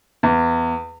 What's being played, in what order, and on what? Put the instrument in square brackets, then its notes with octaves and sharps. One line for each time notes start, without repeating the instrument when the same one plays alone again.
[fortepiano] E2